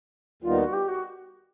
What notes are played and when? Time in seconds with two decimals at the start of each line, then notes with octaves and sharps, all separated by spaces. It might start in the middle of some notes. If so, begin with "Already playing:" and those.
0.42 D#2 D#3 G3 B3 D#4 F4
0.58 F#4
0.73 G4
0.88 F#4